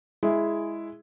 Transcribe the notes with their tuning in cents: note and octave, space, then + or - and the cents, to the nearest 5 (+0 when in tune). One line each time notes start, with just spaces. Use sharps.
G#3 +0 E4 +0 G#4 +5